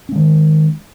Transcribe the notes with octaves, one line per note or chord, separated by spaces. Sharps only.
D#3 G#3 C#4